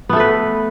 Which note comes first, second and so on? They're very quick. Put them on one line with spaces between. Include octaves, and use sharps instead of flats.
B3 A3 A4 B4